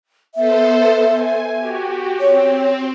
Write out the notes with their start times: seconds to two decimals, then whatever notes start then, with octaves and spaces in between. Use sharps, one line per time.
0.35 B3 A4 C5 E5
1.11 G#5
1.57 F#4 G4
2.20 C4 C#5